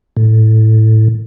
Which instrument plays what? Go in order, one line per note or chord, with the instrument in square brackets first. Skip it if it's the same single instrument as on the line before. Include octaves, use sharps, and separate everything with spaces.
[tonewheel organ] A2